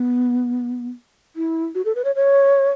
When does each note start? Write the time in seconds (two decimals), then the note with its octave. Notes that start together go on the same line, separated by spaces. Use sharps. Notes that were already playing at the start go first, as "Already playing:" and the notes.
Already playing: B3
1.36 E4
1.75 F#4
1.85 A4
1.95 B4
2.05 C#5
2.15 C#5